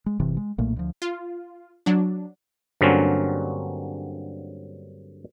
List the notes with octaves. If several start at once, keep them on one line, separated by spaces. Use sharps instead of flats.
G#3
G1 C3 E3
G#3
B1 A#2 A3 A#3
D2 F3
F4
F#3 D4
G2 D3 F#3 A#3 C4 C#4